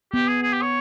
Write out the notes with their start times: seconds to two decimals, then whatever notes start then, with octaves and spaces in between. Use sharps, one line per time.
0.13 B3 G4
0.28 G#4
0.43 G#4
0.53 G4
0.62 C#5